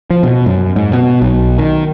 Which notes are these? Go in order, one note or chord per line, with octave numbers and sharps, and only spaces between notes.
F3
B2
F#2
G#2
B2
B1
D#3